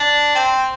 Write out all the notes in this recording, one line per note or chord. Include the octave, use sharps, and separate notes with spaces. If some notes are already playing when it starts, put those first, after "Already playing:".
Already playing: D4
C4